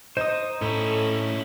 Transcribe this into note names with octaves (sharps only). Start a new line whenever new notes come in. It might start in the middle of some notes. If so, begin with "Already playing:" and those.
D#4 C5 D#6
A2 C#4 E4 A4